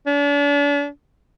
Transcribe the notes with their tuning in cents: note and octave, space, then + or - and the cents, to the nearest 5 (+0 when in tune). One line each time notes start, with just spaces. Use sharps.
D4 -40